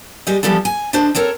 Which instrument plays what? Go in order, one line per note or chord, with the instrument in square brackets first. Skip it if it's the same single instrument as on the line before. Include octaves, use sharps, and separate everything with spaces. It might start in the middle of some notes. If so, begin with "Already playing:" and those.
[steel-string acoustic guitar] G3 G#3 G4 D#5
E3 F3 G3 B3 A4
G#5
D3 F3 D4 C5 D#5
C4 A4 A#4 C#5